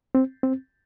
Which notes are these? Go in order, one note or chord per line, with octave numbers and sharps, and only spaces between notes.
C4
C4